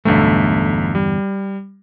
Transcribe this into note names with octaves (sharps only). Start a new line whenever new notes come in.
B1 E2 G2 D3 A3
G3